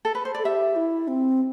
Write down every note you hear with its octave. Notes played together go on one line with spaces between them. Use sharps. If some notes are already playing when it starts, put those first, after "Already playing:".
A4
B4
C5
A4 D5
G4 E5
E4
C4